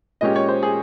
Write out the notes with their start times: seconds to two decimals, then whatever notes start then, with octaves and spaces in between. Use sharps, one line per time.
0.21 A#2 G#3 C#4 G4 D#5
0.36 C#5
0.49 C5
0.63 G#4